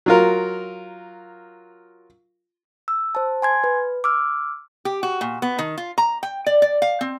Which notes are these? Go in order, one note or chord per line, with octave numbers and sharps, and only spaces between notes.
F#3 F4 A#4
E6
C5 A5
G#5 C6 G#6
B4
D6 E6 F6
G4
F#4
A#2
B3
D#3
F4
A#5
G5
D5
D5
F5
C4